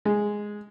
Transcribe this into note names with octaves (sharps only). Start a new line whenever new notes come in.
G#3